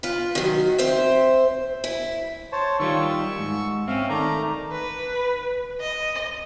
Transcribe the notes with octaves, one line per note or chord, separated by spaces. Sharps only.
F4 B4
D#3 F#3
C4 C5 E5
E4
C5 C#5 A5
D#3 G3 F4 C#6 E6
G#2
C4 C#4 E5 F5
D#3 A3 D5 A#5
B4
D#5